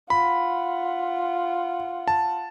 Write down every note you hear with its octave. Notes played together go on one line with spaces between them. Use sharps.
F4 F#5 B5
A5